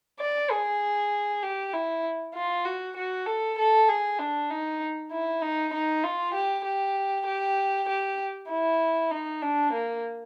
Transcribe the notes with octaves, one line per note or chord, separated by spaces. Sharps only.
D5
G#4
G4
E4
F4
F#4
F#4
A4
A4
G#4
D4
D#4
E4
D#4
D#4
F4
G4
G4
G4
G4
E4
D#4
D4
A#3